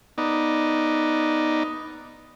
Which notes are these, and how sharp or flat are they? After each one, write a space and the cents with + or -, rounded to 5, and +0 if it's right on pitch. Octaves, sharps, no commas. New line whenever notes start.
B3 -5 D#4 +0 D5 +0